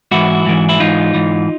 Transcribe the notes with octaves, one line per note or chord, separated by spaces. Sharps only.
G#2 E3 E4 F#4
G#2 E3
E4
G#2 E3 D#4 F4
G#2 E3